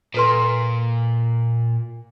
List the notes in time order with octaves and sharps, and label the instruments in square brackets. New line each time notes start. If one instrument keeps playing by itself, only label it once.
[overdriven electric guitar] A#2 [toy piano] A4 B4 C6